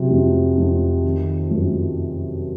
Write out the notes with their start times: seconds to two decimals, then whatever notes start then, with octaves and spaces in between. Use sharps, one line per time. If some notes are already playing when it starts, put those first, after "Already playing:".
Already playing: C3 F#3
0.10 F2
0.57 F2
1.04 D#3
1.51 F#2